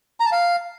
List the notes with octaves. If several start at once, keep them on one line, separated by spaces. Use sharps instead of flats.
A#5
A5
F5